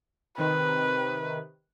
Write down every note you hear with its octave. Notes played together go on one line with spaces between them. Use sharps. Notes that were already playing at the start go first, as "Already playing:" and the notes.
C3 D#3 B4